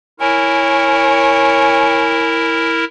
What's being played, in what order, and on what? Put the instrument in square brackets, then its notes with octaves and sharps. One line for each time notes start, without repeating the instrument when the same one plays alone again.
[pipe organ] E4 A#4 [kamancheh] C#5 G#5